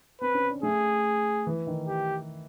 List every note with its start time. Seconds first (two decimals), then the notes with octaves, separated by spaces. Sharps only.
0.21 C4 B4
0.34 C#4
0.49 D4
0.63 A3 G#4
1.47 E3
1.67 D#3
1.88 G4